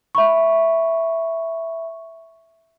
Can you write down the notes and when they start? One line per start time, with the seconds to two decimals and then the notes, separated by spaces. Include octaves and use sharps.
0.15 E5 B5 C#6